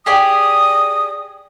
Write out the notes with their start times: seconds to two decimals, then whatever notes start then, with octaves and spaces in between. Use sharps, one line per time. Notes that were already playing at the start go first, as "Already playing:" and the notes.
0.06 G4 G#4 D5 D#6